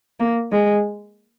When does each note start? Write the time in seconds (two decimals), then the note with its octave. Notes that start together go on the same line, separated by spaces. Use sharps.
0.20 A#3
0.51 G#3